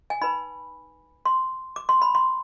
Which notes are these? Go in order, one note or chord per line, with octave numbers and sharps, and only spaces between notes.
G#5
D#4 B4 B5
C6
D6
C6
B5
C6